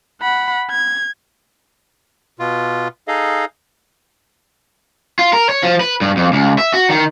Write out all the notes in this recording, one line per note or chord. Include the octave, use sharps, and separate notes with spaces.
F#5 B5
G#6
B2 F4
D#4 G#4 A4 D#5 F5
F4
A#4
C#5
F3
B4
G2
F2
C#2
E5
F#4
D#3